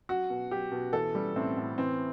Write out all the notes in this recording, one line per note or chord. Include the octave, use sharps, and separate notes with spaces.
F#3 F#4
B2
F#3 G4
B2
E3 A4
G3
A2 C4
A2
E3 C4